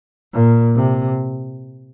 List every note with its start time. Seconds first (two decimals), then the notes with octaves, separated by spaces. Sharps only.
0.34 A#2
0.76 C3